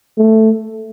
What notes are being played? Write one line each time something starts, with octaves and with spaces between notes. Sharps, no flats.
A3